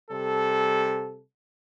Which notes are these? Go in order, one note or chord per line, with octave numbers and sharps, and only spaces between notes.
C3 G3 A4